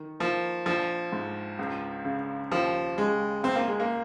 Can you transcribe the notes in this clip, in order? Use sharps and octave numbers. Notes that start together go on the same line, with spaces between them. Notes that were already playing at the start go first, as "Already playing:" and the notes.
Already playing: D#3
F3 A#3
A#1 F3
G#2
C#2
C#3
D#2 F3
C#3 G#3
C#2 C4
A#3
G#3
A#3